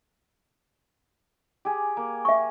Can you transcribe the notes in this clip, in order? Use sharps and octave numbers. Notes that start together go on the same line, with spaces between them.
G4 G#4
A#3
E5 C#6